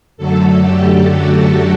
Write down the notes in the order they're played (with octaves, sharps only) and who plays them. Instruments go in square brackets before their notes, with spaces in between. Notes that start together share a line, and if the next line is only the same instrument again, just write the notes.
[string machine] F#2 D3 F#3 A3 A4
G4
F#4